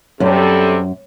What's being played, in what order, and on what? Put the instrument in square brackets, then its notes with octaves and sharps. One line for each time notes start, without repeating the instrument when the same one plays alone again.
[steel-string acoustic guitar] F#2 [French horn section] C3 G3 A4